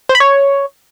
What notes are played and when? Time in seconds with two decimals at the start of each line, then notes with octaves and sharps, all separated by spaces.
0.09 C5
0.15 B5
0.20 C#5